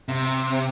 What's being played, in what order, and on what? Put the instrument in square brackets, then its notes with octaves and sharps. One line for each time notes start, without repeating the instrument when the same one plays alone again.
[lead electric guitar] C3